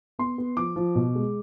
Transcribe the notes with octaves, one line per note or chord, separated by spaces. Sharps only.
B3 C6
B3
F3 D6
F3
B2
G#3